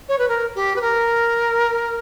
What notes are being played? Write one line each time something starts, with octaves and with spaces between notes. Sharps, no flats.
C#5
B4
A#4
G4
B4
A#4